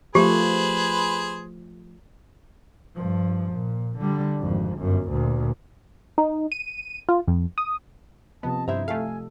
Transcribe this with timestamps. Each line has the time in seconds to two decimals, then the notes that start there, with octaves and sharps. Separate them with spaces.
0.15 F3 A3 G4 G#4 B4 C5
2.95 G2 F3
3.52 A#2
3.99 D3 G3
4.40 G#1 F2
4.79 G1 F#2
5.09 D2 A#2
6.18 D#4
6.52 D#7
7.09 F4
7.28 F2
7.58 D#6
8.43 C3 F3 B3 D#5 A5
8.68 G2 E4 C5 E5 A#5
8.88 A3 A4 F5 G#5